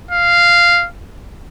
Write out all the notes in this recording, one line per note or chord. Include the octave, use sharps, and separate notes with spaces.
F5